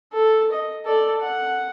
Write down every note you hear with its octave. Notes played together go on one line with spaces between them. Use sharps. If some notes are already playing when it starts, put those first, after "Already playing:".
A4
D#5
A4 D5
F#5